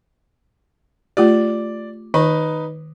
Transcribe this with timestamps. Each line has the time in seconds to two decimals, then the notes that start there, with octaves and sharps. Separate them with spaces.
1.17 A3 F4 G4 D5
2.14 D#3 D#4 B4